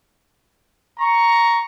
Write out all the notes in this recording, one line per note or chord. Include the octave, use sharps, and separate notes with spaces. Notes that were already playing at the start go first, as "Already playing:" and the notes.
A#5 C#6